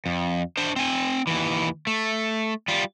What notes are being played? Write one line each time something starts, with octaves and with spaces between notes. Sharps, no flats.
F2
D4 C5
C4 G#5
D#2 E3
A3
G3 F4